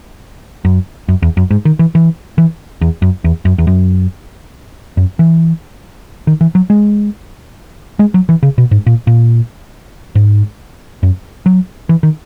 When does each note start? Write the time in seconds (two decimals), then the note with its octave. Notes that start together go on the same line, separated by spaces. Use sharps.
0.65 F#2
1.09 F#2
1.22 E2
1.37 F#2
1.51 G#2
1.65 D#3
1.79 E3
1.95 E3
2.38 E3
2.81 E2
3.02 F#2
3.24 E2
3.45 F#2
3.58 E2
3.67 F#2
4.97 F#2
5.19 E3
6.27 D#3
6.41 E3
6.55 F#3
6.70 G#3
7.99 G#3
8.14 F#3
8.29 E3
8.43 C#3
8.58 B2
8.71 G#2
8.86 A#2
9.07 A#2
10.15 G#2
11.03 F#2
11.46 F#3
11.89 E3
12.03 D#3